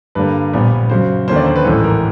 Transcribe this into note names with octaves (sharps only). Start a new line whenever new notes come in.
G2 D3 G3 A#3 B4
A#1 A#2 G3 B3
F#2 C#3 F#3 C5
D#2 D3 F3 A#3 C#4 C5
D5
C5
B4
A1 G#2 E3 A4
A#4